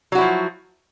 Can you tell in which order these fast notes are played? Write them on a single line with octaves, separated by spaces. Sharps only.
F#3 F#4 E4 F3